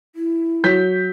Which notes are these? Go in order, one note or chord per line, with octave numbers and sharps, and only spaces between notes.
E4
F#3 G6 B6